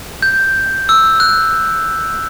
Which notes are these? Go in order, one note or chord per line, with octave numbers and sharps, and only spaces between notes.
G6
E6
F#6